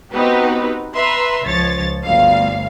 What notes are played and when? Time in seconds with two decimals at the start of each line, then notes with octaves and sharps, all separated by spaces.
0.13 B3 C4 D#4 F#4 G4 B4
0.95 B4 E5 A#5 C6
1.43 C#2 F3 C#5 A6
2.04 G1 D2 F5